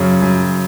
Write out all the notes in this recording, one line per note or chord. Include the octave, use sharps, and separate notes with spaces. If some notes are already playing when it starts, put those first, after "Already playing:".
Already playing: F#2 C#3
F#2